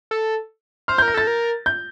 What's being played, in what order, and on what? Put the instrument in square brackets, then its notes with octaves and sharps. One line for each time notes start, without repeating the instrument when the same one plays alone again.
[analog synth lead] A4
[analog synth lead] C5 [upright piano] F6
[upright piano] G6
[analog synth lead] A#4
[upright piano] A#6
[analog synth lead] A4 [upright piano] A6
[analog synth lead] A#4
[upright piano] G6